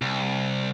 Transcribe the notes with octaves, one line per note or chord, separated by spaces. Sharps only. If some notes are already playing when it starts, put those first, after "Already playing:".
C2